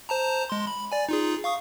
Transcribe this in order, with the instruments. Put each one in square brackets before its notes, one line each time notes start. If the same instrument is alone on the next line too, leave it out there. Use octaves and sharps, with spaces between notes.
[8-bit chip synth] C5 A5 A#5
G#3 C6
B5
D5 G#5
D#4 F4 G#4
F5 C#6 D#6